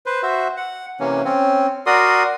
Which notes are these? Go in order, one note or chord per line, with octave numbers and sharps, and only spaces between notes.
B4 C5
F#4 C5 E5
F#5
C3 E3 A#3 C#4
C4 C#4
F#4 A#4 D5 C6 D#6